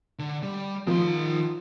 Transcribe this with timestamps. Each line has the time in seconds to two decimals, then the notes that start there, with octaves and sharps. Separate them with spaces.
0.19 D3
0.43 G3
0.87 D#3 F3 C6